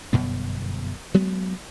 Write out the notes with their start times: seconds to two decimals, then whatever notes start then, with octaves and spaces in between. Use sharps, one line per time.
0.13 G1 F#2 B2 B3
1.14 F#3 G#3 B3